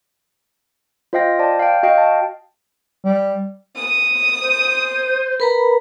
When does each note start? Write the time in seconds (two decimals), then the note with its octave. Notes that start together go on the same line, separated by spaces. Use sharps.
1.13 F4 C5 D#5 F5 G5 A#6
1.39 C5 D5 G5 A5
1.59 F5 G5
1.83 F#4 D#5 F5 G5
1.98 A5
3.05 G3
3.75 D#6
4.42 C5
5.40 A#4 B4 A#5 B5